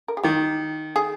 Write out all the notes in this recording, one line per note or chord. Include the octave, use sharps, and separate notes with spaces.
A#4
G#4
D#3 G4
G#4